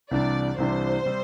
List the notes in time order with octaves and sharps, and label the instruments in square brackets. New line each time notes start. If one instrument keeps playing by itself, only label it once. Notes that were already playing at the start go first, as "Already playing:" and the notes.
[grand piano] C2 C3 E3 G3 D4 [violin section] D5
[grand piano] C2 C3 E3 G3 D4 [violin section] C5
[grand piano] C3 G3 C4